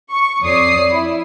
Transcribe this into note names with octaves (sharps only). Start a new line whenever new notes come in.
C#6
F2 C#5 D5 D#6 C7
E4